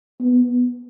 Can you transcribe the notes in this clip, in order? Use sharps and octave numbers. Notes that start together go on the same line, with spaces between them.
B3